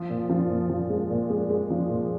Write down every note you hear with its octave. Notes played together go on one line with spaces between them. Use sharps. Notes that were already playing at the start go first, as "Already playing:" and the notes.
Already playing: F3
A#2
F3
A#2
F3
G#3
A#2
G#3
G#3
F3
A#2